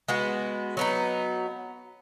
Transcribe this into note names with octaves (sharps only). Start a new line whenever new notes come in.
G#3 B3 F#4
F#3 B3 D#4